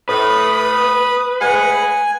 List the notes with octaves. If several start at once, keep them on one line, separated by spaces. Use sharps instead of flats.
A2 B4 B5 D#6
A2 G#3 F#5 G#5